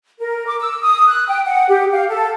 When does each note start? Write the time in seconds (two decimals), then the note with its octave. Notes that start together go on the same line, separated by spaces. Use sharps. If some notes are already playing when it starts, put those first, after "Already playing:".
0.20 A#4
0.46 D6
0.60 E6
0.82 D#6
1.08 F#6
1.29 G5
1.46 F#5
1.68 G4
1.93 F5
2.09 A4